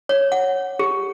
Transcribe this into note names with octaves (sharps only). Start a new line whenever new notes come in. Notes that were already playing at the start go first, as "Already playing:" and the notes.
C#5
F#5
G4